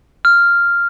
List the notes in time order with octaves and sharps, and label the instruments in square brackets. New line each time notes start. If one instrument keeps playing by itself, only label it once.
[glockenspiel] F6